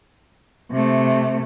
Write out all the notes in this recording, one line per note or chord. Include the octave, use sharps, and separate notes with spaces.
C3 A3